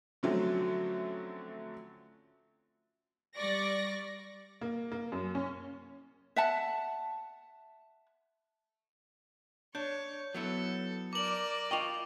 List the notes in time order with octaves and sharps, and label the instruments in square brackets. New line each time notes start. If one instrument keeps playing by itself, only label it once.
[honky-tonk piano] D3 F3 F#3 A3 C4 C#4
[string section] G3 D5 C#6 D6 A#6
[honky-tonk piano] A#3
A#3
F#2
C#4
[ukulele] E5 F#5 A5
[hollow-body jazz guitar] D4 [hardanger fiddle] C#5 [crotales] G6
[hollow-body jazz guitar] F#3 B3 E4 [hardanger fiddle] A4
[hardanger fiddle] A#4 D5 [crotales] D6 F#7
[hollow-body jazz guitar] F4 D#5 [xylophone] G5 C#6 F7